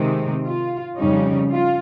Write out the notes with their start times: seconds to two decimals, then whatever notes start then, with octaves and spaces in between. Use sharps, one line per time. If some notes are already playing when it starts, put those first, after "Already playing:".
Already playing: C3 D#3 G#3 C4 D#4
0.43 F4
0.97 F2 C#3 G3 C#4 D#4
1.50 F4